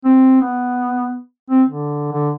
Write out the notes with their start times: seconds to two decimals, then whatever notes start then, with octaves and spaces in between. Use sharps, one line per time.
0.05 C4
0.41 B3
1.50 C4
1.69 D3
2.12 D3